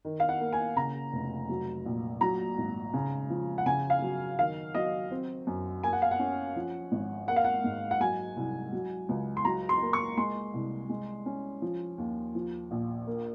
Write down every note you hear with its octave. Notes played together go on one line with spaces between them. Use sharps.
D#3
F5
F#5
A#3
G#5
C#3 A#5
F1
F#3
A#1
F#3 A#5
G#1
C#3
F3
F#5
C#3 G#5
F5
F#3
D#3 F5
F#3 D#5
C4
F#2
A#3 G#5
F#5
F5
F#5
C#4
F3
G#1
A#3 F#5
F5
F#5
G#2
F#5
F#3 G#5
C2
F#3
C#2
C6
F#3 A#5
C6
A#3
C#6
G#3 C6
C2
G#3
C#4
F3
D#2
F3
A#1
A#3